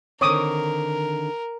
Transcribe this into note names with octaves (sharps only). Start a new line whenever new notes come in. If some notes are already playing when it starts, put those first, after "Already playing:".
D3 D#3 C4 A#4 C#5 D6 D#6